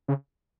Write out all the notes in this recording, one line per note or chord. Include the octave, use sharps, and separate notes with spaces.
C#3